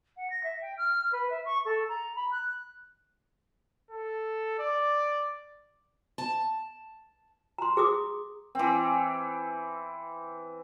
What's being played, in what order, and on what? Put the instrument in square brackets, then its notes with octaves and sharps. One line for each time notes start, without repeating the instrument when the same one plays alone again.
[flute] F#5
A#6
E5
G5
F6
B4
E5
C#6
A4
A#5
B5
F#6
[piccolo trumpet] A4
D5
[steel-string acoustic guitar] A5
[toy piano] A#5 C6
G#4 D6 D#6
[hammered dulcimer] E3 C4